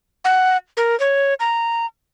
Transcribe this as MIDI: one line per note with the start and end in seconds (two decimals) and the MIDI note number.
0.25 0.57 78
0.77 0.98 70
1.00 1.34 73
1.40 1.86 82